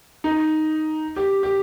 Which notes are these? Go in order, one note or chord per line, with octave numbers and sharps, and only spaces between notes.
D#4
G4
G4